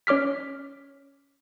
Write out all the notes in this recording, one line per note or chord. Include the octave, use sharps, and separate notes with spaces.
C#4 C#5 D6 F6 B6